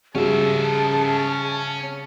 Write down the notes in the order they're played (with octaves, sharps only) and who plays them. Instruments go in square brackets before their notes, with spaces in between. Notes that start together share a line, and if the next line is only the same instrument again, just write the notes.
[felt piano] C#3 G3 F#4 [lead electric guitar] C#4 E5 [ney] G#4 [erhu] A5